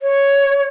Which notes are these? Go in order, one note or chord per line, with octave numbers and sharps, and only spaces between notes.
C#5